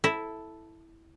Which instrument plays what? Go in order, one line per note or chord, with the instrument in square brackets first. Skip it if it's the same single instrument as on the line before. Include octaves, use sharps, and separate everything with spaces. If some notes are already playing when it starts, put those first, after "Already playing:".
[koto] E4 [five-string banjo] A4